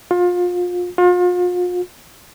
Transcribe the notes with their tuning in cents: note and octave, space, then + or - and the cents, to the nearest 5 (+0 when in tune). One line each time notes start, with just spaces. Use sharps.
F4 +30
F4 +40